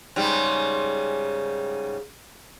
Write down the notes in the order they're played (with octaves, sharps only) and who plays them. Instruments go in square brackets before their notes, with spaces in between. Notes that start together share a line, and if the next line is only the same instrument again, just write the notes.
[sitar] G#2 C#3 G3